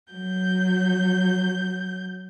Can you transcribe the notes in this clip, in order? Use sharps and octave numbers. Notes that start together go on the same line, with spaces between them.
F#3 G6